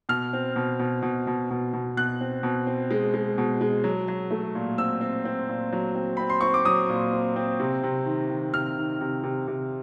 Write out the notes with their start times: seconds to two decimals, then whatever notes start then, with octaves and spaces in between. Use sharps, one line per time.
0.09 B2 F6
0.33 C4
0.56 B2
0.79 B2
1.02 B2
1.27 B2
1.51 B2
1.73 B2
1.97 B2 F#6
2.21 C4
2.43 B2
2.67 C4
2.91 G#3
3.14 G#3
3.38 B2
3.61 G#3
3.84 F#3
4.08 F#3
4.31 A3
4.55 A#2
4.78 C4 E6
5.01 C4
5.25 C4
5.49 A#2
5.73 F#3
5.95 C4
6.17 C4 B5
6.30 C6
6.41 C4 C#6
6.54 D6
6.65 F#3 D#6
6.89 A#2
7.13 C4
7.36 C4
7.60 C3
7.83 C3
8.06 D#3
8.30 D#3
8.54 C3 F6
8.77 D#3
9.01 C3
9.24 C3
9.48 C3